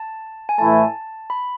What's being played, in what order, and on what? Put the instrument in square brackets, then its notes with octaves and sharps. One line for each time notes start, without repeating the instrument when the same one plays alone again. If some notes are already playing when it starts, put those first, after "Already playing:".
Already playing: [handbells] A5
G#5
[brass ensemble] A2 E3 A3 E4 [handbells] A5
[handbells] B5